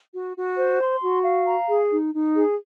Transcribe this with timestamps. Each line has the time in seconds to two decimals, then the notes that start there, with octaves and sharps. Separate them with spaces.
0.13 F#4
0.36 F#4
0.57 C5
0.79 C6
1.02 F#4
1.23 F5
1.46 A#5
1.68 G#4
1.90 D#4
2.14 D#4
2.35 G#4